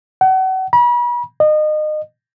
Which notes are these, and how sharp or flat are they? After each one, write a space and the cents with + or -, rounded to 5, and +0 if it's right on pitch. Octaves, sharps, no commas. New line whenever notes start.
F#5 +35
B5 -40
D#5 -30